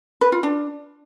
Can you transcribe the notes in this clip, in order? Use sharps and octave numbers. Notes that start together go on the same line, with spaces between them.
B4
F4
D4